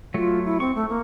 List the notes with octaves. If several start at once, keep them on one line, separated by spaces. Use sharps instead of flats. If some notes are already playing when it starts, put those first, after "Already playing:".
F#3 A3 F4
E4
C4 C#6
A3
A#3